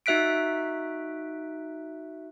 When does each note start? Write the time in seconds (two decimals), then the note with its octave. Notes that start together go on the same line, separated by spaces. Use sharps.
0.06 D#4 F#4 E5 F#6 B6 D7